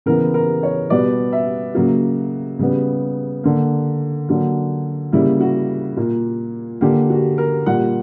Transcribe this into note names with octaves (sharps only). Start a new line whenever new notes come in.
C#3 E3 B3 A#4
A#4
C#5
B2 G3 B3 D5
E5
C#3 F#3 A#3 F#4
C#3 G3 B3
D3 A#3
D3 F#3 A#3
C#3 G3 A#3 E4
F#4
A#2 A#3
D3 A#3 G4
F#4
A#4
A#2 G3 A#3 F#5